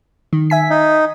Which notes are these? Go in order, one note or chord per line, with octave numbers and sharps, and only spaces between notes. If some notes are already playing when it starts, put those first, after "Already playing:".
D#3
E5 G#5 B6
D#4